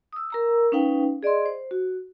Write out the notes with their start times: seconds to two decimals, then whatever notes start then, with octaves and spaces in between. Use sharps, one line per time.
0.13 D#6 E6
0.30 A#4 A#5 E6
0.72 C#4 D#4 B4 F5 G5
1.23 G#4 D5 D#5 C6
1.46 C5
1.71 F#4